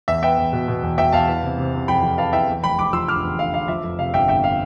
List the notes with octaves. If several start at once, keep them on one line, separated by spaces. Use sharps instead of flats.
E2 E5
B3 E5 G5
E2
B2
B2
E2
E2 E5 G5
E2 F5 A5
E3
C3
C3
C3
F2 G5 B5
F2
E3 F5 A5
E3 E5 G5
E2
F1 G5 B5
F1 B5 D6
F3 C6 E6
D3 D6 F6
E2
D3 F5
D3 F5
F3 E5
F2
C3 F5
G1 E5 G5
G1 E5 G5
F5